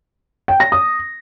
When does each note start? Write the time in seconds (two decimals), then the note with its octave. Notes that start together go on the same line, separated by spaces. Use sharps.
0.48 G5
0.60 A#6
0.72 D#6